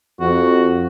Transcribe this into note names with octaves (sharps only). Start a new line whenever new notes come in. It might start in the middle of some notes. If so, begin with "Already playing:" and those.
F2 F#4